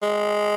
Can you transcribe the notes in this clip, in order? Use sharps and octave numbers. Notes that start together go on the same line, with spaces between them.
G#3